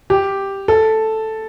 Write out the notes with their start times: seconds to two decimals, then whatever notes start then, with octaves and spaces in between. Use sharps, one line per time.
0.10 G4
0.68 A4